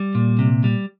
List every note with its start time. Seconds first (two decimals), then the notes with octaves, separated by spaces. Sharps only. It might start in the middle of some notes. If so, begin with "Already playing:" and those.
Already playing: G3
0.15 A#2
0.39 C3
0.64 G3